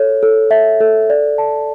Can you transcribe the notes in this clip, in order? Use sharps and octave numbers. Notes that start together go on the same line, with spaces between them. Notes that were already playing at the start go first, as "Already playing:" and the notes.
Already playing: A4 C#5
A4
E5
A4
D5
A5